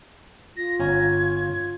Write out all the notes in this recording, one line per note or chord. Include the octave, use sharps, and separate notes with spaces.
F4 A#6
G1 C#4 A#5 G#6